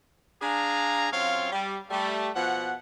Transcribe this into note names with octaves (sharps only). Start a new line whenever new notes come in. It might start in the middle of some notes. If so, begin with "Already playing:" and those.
D4 G#4 F5 G#5 A#5
F#2 C4 F4 C#5 F5
G3
G3 A3
B2 F3 F#5